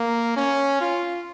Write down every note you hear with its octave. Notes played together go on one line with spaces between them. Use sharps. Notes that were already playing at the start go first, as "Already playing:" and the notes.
Already playing: A#3
C#4
F4